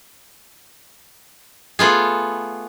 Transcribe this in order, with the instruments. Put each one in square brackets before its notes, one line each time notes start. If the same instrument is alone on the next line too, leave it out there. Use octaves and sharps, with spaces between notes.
[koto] A3 B3 F4 G#4